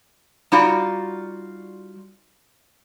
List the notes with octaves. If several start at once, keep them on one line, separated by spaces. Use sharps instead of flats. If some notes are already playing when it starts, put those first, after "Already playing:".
G3 D#4 F4 F#4 D5